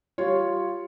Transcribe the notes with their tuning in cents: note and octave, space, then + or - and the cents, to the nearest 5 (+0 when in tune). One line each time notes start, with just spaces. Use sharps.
G3 -20 F4 +0 C#5 +0